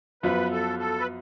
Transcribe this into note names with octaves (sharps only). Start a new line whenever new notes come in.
F#2 F3 B3 F4 B4
A4
A4
B4